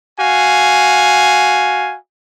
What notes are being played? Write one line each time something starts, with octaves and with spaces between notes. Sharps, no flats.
F#4 F5 G#5